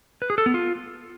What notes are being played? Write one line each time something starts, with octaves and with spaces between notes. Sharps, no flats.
B4
G#4
A4
B3
F4